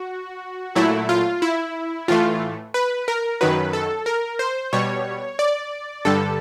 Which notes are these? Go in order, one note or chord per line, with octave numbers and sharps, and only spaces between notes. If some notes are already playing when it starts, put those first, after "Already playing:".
Already playing: F#4
A#2 F#3 A3 E4
F4
E4
A2 E3 A3 F4
B4
A#4
F#2 D#3 F#3 B4
A4
A#4
C5
B2 G3 C#5
D5
G2 D3 G3 A4